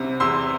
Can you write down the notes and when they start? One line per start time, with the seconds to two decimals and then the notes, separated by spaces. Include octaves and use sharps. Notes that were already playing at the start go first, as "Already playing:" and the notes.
Already playing: C2 C3
0.20 E2 C6 E6